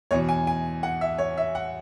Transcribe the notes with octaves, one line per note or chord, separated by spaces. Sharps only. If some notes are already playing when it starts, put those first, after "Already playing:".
E2 B2 C#5
G#5
G#5
F#5
E5
C#5
E5
F#5